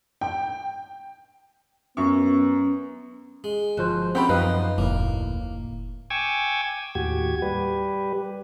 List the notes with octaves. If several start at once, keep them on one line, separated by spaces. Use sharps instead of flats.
G5
F#2 B3 C#4 C#6
G#3
G1 F3 F#4 C5
C4 C#4 D#4 G4 A4 F#5 G5 B5
F#2 F3 D#4 B4 D#5 F5
F1 D2 A2 A#3
G5 G#5 C#6 D6 E6 G#6
D#2 A2 F#4 G4 G#6
G3 G4 B4